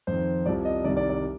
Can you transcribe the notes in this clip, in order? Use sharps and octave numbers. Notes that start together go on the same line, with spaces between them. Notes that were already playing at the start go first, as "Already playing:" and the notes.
F2 D#3 C5
C2 C3 F3 D5
D#5
C2 C3 D#3 D5
D5
D5